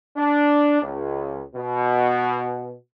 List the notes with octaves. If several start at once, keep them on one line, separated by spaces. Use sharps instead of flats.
D4
C#2
B2